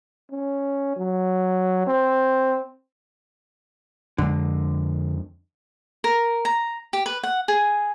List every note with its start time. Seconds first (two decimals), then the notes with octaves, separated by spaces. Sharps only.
0.31 C#4
0.97 F#3
1.87 C4
4.18 F2 D3 G#3
6.04 A#4
6.45 A#5
6.93 G4
7.06 B4
7.23 F#5
7.48 G#4